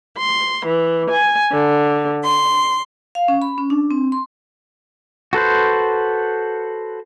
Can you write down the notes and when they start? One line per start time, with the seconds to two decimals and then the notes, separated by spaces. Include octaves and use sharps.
0.17 C6
0.65 E3
1.10 G#5
1.50 D3
2.23 C6
3.15 F5
3.28 C#4
3.42 B5
3.58 C#4
3.70 D4
3.91 C4
4.12 C6
5.33 F#4 A4 B4 C5